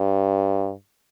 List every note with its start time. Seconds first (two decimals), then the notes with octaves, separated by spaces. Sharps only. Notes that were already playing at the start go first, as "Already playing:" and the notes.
Already playing: G2